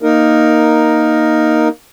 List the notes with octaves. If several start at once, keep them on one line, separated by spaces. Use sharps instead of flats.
A#3 D#4 A#4